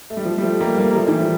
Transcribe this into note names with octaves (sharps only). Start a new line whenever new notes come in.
A3
G3
F3
G3
F3 A3
G3 A#3
G3 A#3
A#3
F3 A3
E3 G3
F3